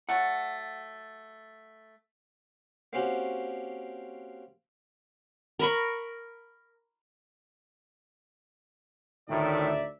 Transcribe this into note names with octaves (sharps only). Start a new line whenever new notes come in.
F#3 A3 F#5
A#3 C4 C#4 F#4 G4
A#4 B5 C#6
D2 A2 D#3 D#4 D5 E5